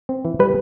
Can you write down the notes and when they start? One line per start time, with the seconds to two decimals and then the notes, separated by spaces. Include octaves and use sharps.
0.09 C4
0.25 E3
0.39 G3 B4